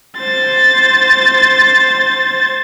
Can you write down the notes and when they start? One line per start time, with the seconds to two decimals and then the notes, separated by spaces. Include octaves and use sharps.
0.20 C5 A6